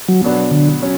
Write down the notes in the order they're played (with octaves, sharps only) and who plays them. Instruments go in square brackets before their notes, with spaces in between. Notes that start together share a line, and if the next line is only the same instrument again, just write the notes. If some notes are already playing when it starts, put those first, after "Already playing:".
[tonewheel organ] F#3
[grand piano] B2 F#3 B3 D4
[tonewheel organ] D3
[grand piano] F#3 C#4